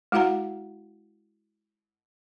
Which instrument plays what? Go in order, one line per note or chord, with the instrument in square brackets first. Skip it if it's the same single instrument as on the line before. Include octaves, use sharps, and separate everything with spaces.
[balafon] G#3 E4 F#4 F5 F#5 A#5